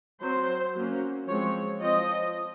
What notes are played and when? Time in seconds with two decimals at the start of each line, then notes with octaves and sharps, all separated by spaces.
0.22 F#3 C4 C5
0.75 F#3 A#3 C#4
1.28 F3 G#3 C4 C#5
1.81 F3 C4 D#5